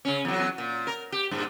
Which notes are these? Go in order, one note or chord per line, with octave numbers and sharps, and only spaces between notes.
C#3 C#4
E2 F#3
A#2
A#4
G4
G2 A#2